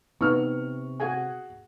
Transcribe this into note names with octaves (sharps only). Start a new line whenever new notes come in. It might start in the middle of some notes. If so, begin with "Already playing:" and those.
C3 B3 D#4 C#6 F6
F#4 G#4 F#5 G#5